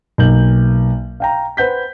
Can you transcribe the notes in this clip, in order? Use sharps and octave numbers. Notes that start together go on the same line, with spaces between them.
B1 A#3 G6 F#7
F5 G5 A#5
B4 C5 F#5 G6 B6